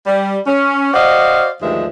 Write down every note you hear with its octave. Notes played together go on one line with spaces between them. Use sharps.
G3
C#4
F#4 C5 D5 D#5 F5 F#5
D2 G2 D#3 F3 G#3 E5